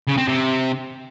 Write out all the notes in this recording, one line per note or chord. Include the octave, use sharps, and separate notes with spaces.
C#3
C4
C3